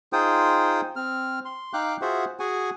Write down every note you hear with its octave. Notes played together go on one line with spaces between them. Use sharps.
D#4 F4 G#4 C5 G5 D#6
C4 F6
C6
D#4 F5 G5 D6 F#6
F4 F#4 G#4 C5 E5 F#5
F#4 G#4 F#5 G#5